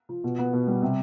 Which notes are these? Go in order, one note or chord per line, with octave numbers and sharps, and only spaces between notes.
F3
B2
B3
B2
G3
C3